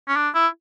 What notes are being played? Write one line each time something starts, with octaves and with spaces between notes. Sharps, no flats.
C#4
D4
E4